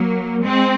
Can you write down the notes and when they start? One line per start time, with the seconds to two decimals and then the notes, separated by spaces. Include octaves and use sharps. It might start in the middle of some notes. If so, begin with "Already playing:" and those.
Already playing: F#3 A#3
0.44 G#3 C4